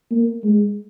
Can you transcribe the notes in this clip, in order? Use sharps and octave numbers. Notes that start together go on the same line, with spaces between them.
A#3
G#3